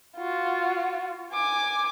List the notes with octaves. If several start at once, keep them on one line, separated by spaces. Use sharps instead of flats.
F4 F#4
G#5 D6